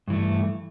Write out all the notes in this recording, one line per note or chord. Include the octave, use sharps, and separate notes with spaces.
G2 E3 A3